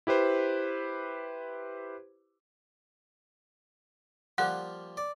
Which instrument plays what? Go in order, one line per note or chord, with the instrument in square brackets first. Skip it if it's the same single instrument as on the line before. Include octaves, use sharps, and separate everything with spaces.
[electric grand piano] E4 G4 B4 C5
[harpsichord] F3 G3 A#3 [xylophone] F#5 F#6
[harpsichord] D5